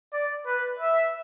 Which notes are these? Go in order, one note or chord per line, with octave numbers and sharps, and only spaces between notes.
D5
B4
E5